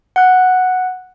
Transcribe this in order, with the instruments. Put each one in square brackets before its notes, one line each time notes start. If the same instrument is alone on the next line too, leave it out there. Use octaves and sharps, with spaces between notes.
[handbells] F#5 F#6